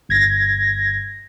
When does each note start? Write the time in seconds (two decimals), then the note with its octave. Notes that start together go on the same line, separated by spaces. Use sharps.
0.09 G1 G#6 A#6